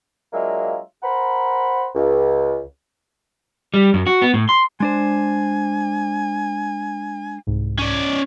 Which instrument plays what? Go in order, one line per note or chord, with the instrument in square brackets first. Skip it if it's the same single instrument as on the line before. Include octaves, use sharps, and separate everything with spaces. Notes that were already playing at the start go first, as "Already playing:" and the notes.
[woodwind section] F#3 G#3 A#3 D4 F4 E5
A#4 C5 F#5 A#5 B5
C#2
[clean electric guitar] G3
F#2
F#4
B3
A2
C6
[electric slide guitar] G#3 D4 C5 [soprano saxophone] G#5
[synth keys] C2 G#2
[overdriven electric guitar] C#4 D5